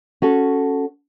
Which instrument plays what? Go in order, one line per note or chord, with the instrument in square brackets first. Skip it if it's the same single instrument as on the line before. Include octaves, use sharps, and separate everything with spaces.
[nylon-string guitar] C#4 F#4 A4